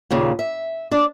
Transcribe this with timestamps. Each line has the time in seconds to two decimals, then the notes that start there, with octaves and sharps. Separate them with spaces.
0.11 D#2 A#2 C#3
0.39 E5
0.91 D4 D5